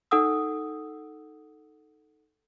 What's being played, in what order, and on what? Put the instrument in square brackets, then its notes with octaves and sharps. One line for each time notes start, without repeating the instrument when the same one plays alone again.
[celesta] D#4 A4 F#5 D#6 E6